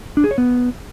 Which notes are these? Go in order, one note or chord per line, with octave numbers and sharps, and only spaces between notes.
D4
G#4
C#5
B3